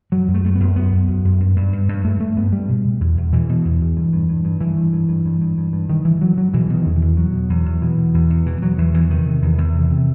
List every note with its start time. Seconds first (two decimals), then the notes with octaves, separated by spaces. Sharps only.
0.12 F#2 F#3
0.28 F#2
0.34 A3
0.44 F#2 A3
0.55 F#2 B3
0.76 F#2 B3
0.92 F#2
1.09 F#2
1.24 F#2
1.40 G2
1.56 G2
1.73 G2
1.88 G2
2.04 G2 A3
2.20 G2 A3
2.37 G2 B3
2.53 G2 G3
2.69 B2
2.85 B2
3.01 E2
3.17 E2
3.33 B2 E3
3.49 B2
3.65 E2
3.81 E2
3.97 G2
4.13 G2
4.29 G2
4.45 G2
4.61 G2 E3
4.77 G2
4.93 G2
5.09 G2
5.25 G2
5.41 G2
5.58 G2
5.73 G2
5.90 G2 D#3
6.05 G2 E3
6.21 G2 F#3
6.38 G2 F#3
6.54 B2 E3
6.70 B2 D#3
6.86 E2
6.96 E3
7.02 E2
7.17 B2 F#3
7.34 B2
7.50 E2
7.66 E2
7.82 B2 E3
7.98 B2
8.14 E2
8.30 E2
8.46 B2 E3
8.62 B2 F#3
8.78 E2 E3
8.94 E2 E3
9.10 C3 D#3
9.26 C3
9.42 E2
9.58 E2
9.74 C3
9.90 C3